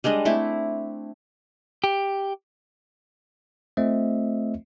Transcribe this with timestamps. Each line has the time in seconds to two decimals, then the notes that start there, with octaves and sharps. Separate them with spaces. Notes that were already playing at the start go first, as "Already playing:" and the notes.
0.04 G3 G#3 D4 D#5
0.25 A3 C4 E4
1.84 G4
3.77 A3 C4 F4 C5 D#5 E5